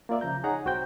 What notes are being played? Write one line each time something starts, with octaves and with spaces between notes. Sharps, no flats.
A#3 F4 D5 E5
C#3 F3 A#5 G6
D#4 G#4 C#5 F#5 A#5
C2 F#4 C5 G5 G6